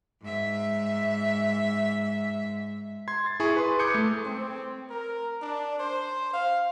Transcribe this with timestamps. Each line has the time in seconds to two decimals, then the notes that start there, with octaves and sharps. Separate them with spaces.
0.22 G#2 E5
3.08 C6 G#6
3.26 A6
3.40 E4 G#4 G#5 C#6
3.56 B4 C6
3.79 D6 D#6 G6 G#6 C#7
3.94 A3
4.25 C4
4.90 A#4
5.42 D4
5.79 C5
6.33 F5